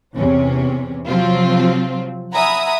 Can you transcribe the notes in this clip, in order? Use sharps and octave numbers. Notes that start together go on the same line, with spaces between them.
E2 C3 C#4
C3 F3 F#3 C4 F4
E5 F#5 G#5 A#5 B5 D#6